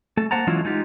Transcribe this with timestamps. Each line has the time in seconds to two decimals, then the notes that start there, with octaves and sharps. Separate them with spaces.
0.17 A3 A4
0.31 A#3 C5 F#5 A5 A#5
0.47 E3 F#3 G#3 C#4 E4 F4
0.65 G#3 D#4 F4 G4